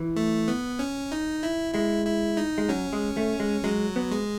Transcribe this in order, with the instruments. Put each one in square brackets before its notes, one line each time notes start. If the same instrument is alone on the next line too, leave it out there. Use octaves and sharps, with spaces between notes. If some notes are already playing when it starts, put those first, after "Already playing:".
Already playing: [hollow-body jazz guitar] E3
[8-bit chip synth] A3
B3
C#4
D#4
E4
[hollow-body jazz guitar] G#3 [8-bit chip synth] E4
[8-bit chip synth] E4
D#4
[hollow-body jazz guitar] G#3
[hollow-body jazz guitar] F#3 [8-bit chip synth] C#4
[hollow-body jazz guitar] G#3
A3
G#3
[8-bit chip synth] F#3 [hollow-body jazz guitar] G#3
[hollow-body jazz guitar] B3
[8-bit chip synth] G#3